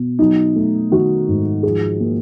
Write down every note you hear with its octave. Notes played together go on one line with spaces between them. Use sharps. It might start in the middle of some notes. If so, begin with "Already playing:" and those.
Already playing: B2
F#3 D#4
A3
D#3 F#4
G#2
F3 G#4
A#3